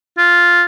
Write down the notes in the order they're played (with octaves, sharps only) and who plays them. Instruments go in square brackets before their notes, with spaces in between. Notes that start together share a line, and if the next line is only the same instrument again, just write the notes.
[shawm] F4